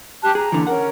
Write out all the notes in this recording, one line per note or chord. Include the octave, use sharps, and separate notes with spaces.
G4 A5 F#6
G#4 A#5
D#2 D3 E3
C#4 A#4 F#5